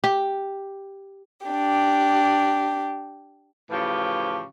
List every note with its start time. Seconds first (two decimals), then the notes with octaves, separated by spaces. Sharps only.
0.04 G4
1.46 D4 G4
3.70 A2 C#3 E3 F3 G4